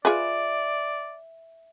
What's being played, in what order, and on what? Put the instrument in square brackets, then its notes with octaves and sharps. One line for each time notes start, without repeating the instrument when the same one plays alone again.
[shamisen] F4 G#4 B4 [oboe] D5 [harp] E5